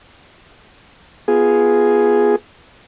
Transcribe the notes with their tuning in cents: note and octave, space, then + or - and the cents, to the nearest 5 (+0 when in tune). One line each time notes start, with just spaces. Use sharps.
B3 +0 F4 +0 G#4 +0